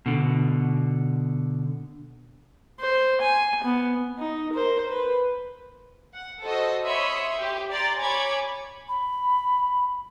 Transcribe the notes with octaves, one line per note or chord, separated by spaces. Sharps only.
B2 D3
C5
G#5
B3
D#4
A#4 C5
B4
F#5
F#4 A4 C5 D#5
C#5 E5 B5 C6 D#6
G4
D5 A#5 C6 A6
C#5 G#5 B5 D6 G#6
B5